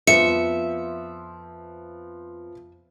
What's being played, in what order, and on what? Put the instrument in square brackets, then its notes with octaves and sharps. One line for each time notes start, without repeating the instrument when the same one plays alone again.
[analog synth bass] F2 [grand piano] F3 B3 C4 [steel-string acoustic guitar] E5 [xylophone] C#7